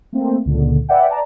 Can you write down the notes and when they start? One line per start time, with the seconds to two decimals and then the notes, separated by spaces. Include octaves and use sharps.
0.13 A3 A#3 C4
0.45 C#2 A#2 D3
0.89 B4 D5 E5 F#5 G5
1.09 D5 A5 A#5